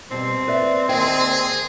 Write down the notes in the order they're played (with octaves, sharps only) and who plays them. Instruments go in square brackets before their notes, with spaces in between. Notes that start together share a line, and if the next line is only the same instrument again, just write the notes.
[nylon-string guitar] B2 G3 [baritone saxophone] C4
[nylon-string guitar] B4 D5 E5
[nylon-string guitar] D#2 D#5 G5 [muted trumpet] G#4